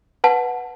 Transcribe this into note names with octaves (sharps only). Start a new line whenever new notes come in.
B4 F#5 A5